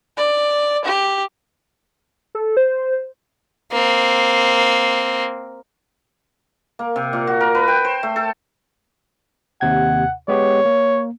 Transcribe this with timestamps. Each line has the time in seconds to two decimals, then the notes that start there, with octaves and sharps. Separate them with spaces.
0.17 D5
0.84 G4
2.35 A4
2.57 C5
3.72 A#3 C4
6.79 A#3
6.96 C3
7.13 A#2
7.27 F#4
7.41 A#4
7.55 B4
7.68 G5
7.85 C5
8.03 A3
8.16 A4
9.61 D#2 C3 F#5 G#6
10.28 G#3 B3 G4 C#5
10.65 A#3